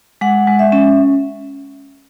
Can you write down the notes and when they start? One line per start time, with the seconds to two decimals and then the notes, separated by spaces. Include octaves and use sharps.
0.21 G#3 F#5
0.47 G#3
0.59 E5
0.72 C#4